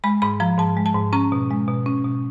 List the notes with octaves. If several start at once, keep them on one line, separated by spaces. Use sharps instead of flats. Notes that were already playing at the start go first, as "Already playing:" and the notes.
G#3 B5
G#2 B5
F3 A#5
G#2 A5
G#3
A5
G#2
C#4 A#5
B2
G#3
B2
C#4
B2